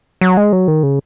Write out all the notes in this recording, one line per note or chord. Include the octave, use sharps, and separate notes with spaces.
F#3
G#3
F#3
D#3
C#3